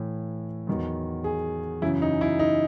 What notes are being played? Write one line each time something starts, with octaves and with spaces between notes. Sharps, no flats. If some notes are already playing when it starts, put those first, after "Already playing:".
Already playing: A2 E3
E2 D#3 F#3
G#4
F#2 C#3 E3 E4
D#4
E4
D#4